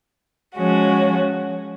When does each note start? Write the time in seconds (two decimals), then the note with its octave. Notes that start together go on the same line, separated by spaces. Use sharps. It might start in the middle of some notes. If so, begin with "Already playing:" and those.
0.56 F3 G#3 C#4 F#4